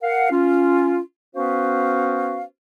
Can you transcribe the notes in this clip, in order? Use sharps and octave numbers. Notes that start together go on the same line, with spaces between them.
A#4 F5 F#5
C#4 F4
B3 C#4 F#4 B4 C5 F5